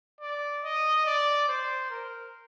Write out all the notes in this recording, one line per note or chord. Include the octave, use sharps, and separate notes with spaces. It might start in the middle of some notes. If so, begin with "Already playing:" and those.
D5
D#5
D5
C5
A#4